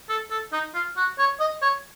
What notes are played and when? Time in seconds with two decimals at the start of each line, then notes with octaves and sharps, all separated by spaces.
0.09 A4
0.31 A4
0.53 D#4
0.74 F4
0.97 F#4
1.18 C#5
1.40 D#5
1.62 C#5